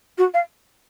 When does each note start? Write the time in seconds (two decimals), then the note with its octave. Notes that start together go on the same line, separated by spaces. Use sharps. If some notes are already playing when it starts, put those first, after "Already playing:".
0.17 F#4
0.34 F5